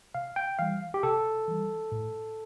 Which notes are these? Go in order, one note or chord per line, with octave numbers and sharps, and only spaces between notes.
C3 F5
G5
E3 G3 F5
G4
C3 A4
E3 G3
A2